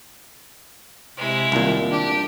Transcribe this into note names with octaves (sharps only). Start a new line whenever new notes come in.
C3 G#3 E4
C2 A#2 D#3
D4 G4